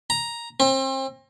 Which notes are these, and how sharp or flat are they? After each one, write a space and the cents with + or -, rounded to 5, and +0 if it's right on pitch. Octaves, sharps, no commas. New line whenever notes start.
A#5 +5
C4 +35